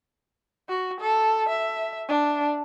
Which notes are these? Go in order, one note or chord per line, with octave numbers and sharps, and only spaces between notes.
F#4
A4
E5
D4